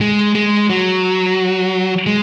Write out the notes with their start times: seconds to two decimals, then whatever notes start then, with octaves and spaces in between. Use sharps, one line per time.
0.01 G#3
0.35 G#3
0.70 F#3
2.06 G#3